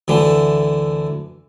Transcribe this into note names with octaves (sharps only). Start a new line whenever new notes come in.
D2 D3 E3